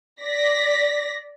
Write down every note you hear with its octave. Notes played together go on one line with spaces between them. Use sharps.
D5 A#6 B6